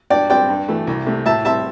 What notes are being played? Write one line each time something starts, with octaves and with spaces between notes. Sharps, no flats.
G2 D5 G5
G3 C4 D5 G5
G2
E3 A3
C2
C3 A3
A2 E5 A5
G3 C4 E5 A5